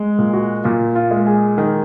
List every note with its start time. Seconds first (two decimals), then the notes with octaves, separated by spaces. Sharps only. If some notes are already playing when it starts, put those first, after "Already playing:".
Already playing: G#3
0.19 A#2
0.34 F#4
0.64 A#2 F4
0.95 F4
1.11 G#3
1.27 G#4
1.58 D#3